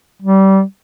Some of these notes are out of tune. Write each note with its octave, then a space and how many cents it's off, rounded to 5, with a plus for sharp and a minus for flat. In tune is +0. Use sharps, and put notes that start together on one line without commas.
G3 -25